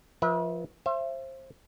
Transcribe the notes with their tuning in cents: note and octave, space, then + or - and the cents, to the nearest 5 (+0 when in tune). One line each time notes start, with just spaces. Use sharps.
F3 -5 B4 -40 E5 -35
C5 +25 E5 +35